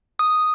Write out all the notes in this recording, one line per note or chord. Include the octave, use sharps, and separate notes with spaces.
D#6